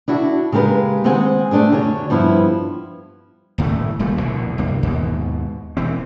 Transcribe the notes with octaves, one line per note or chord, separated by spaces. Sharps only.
D4 E4 F#4 A4
C#3 G#3 G4 A#4 B4
D#3 G#3 C4 C5 F#5 G#5
A3 A#3 D4 G4 G#4
F#2 D3 C#5
G2 F3 B3 E4
D#1 A2 C#3 A3
D#1 A#2 G3 A3
A#1 E2 B2 D3
C2 G2 A#3
D#2 G#2 B2
E1 E3 C4